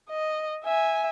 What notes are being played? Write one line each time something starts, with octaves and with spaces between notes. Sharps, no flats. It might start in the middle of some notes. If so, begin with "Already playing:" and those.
D#5
E5 G#5